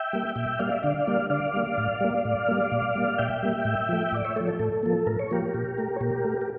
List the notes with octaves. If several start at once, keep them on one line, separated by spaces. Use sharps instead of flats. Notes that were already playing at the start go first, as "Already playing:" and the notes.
Already playing: E5 G5
G3 A#3
A#2 E5 G5
G3 A#3 D5 F5
E5
D3 D5 F5
G3 A#3
D3 D5 F5
G3 A#3
A2
G3 A#3
A2
G3 A#3
A#2
G3 A#3
A#2 E5 G5
G3 A#3
A2
F3 A3
A2 D5
C#5 E5
F3 A3 A4 C#5
A4
A2 A4
F3 A#3
A2 A#4
C#5
F3 A#3 G4 A#4
A#2
A3
C#5
A#2 G4 A#4
A3
A#4